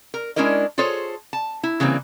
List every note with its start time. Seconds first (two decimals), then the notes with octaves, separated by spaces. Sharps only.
0.14 A#4
0.36 G#3 C#4 D4 E4 A#4 D#5
0.78 F4 G#4 A4 C5 C#5
1.33 A5
1.63 E4
1.80 C#3 E3 G3 A#3 C4